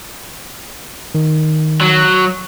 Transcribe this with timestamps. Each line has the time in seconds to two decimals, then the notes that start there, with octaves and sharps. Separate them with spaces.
1.15 D#3
1.81 F#3